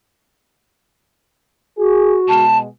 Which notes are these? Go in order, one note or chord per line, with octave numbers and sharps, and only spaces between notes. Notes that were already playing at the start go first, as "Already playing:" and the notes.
F#4 G#4
B2 G#3 A5